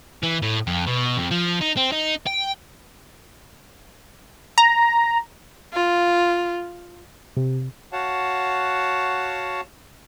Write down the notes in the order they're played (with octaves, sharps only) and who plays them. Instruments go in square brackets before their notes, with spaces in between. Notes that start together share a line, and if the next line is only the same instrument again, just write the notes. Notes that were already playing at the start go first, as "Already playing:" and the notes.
[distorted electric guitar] E3
A2
F2
B2
F2
F3
D#4
C4
D#4
G5
[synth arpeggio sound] A#5
[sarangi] F4
[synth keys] C3
[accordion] F#4 C#5 F5 F#5 A5